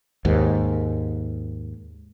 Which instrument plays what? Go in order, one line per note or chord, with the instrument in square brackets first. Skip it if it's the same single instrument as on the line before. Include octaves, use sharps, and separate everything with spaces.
[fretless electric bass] D#2 G#2